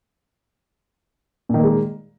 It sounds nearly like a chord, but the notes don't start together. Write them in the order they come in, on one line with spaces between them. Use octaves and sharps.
A#2 D#3 A#3 G#3